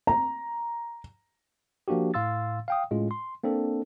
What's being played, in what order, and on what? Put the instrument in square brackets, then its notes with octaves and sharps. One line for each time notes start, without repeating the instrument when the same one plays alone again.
[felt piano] A#5
[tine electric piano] F3 A#3 D4 F#4 G4
A2 F5 C6 E6 A6
F5 G5 D#6
A2 G#3 C#4 F4
C6
A#3 C4 D4 A4